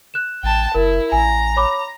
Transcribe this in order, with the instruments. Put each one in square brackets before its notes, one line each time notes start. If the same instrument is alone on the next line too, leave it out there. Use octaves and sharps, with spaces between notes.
[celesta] F#6 E7
[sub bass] A1 [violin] G5 A5
[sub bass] F#1 [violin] E4 [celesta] A#4
[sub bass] A1 [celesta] G#5 [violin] A#5
[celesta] C#5 B5 D6